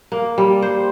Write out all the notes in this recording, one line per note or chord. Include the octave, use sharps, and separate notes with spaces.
A#3
G3
C5